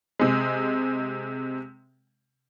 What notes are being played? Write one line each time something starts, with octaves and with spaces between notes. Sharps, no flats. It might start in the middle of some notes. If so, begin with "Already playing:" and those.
C3 G#3